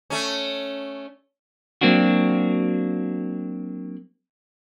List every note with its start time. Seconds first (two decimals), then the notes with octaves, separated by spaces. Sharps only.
0.10 A3 C#4
1.81 F#3 A#3 C4 D4 F#4